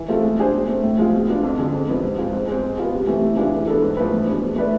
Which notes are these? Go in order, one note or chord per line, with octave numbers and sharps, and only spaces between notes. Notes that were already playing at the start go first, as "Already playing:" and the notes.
Already playing: E3
A3 C4 F4 A4
G#3
D4 G#4 C5
B2
A3 C4
A2
F3 G#3 C4 F4
B2
B3 D4 F4
F2
D3 G#3
F2
C3 F3 B3
G#2
G#3 C4 F4
G#2
G#3 C4
G#3
B3 F4 G#4
C3
E3 A3
C3
E3 G#3 D4 F4
E3
B3 D4 A4
G#2
F3 A3 E4 B4
E2
B2 G#3 D4
B2
A3 E4 B4 D5